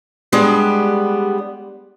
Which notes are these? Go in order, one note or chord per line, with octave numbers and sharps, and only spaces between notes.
G3 G#3 B3 D4 G4